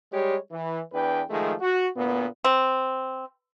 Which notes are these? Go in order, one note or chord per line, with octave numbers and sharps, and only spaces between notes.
G3 G#3 G4 C#5
E3
E2 D4 B4 G5
D#3 F3 G#3 A3
F#4
D2 A#2 B3
C4